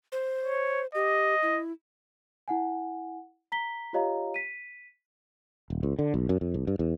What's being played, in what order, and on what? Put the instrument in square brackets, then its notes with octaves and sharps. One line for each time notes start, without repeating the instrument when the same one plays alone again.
[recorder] C5
[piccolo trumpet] C#5
[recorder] G4 [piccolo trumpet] D#5
[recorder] E4
[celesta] E4 F#5 G#5
A#5 B6 G7
F4 G4 C#5 D#5 F5 A#5
B6 D#7
[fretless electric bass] D#1
C#2
D3
B1
F#2
F2
C2
G2
E2